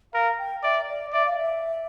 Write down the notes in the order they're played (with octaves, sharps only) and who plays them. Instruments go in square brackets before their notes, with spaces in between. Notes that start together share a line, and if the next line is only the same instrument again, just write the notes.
[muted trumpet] A#4 [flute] F5
[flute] G5
[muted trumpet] D5 [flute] E5
[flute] D5
[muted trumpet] D5 [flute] E5
[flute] F5
E5